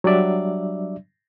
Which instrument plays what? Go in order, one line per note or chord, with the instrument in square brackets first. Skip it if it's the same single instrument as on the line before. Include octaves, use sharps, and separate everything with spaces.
[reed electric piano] F#3 G3 D4 D5 E5